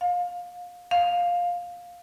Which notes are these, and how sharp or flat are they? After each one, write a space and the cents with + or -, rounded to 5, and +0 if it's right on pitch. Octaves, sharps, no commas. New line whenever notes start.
F5 +25
F5 +10